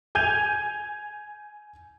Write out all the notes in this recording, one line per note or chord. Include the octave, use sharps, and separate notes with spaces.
G#5 G6 G#6 D#7 F7